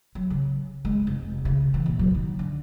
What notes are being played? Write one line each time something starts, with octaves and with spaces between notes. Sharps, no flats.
F#3
C#3
G#3
F1
C#3
E3
A#2
F#3
D#3
D3